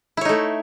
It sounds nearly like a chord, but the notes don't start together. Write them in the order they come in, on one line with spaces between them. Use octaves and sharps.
E4 C#5 D#4 A3